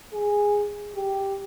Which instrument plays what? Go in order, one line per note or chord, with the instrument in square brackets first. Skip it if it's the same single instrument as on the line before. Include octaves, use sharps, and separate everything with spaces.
[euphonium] G#4
G4